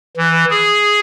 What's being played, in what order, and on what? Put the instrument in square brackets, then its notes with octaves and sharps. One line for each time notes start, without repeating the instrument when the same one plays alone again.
[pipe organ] E3
G#4